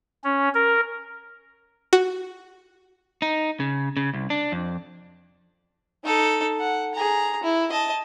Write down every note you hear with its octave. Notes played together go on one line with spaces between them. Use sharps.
C#4
A#4
F#4
D#4
C#3
C#3
C2
D4
F2
D#4 A4
F#5
G#4 A#5
E4
D#5 A5